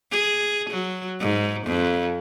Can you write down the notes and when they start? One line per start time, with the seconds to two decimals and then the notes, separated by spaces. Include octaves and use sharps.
0.11 G#4
0.70 F#3
1.20 G#2
1.66 F2